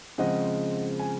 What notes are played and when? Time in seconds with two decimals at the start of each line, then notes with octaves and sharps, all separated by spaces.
0.18 C#3 F3 G#3 C4 D#5 F#5
0.99 G#5